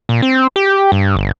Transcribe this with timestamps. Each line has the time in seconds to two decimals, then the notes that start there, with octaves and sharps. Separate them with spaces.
0.09 A#2
0.22 C4
0.56 G4
0.92 G2
1.16 G1